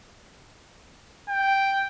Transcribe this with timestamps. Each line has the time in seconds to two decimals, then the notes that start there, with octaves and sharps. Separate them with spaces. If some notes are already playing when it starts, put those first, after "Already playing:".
1.29 G5